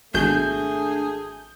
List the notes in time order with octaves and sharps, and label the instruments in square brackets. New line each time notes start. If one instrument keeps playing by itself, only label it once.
[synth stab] G#1 G6 [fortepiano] B2 F#4 [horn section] A3 G#4 A4 [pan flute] D4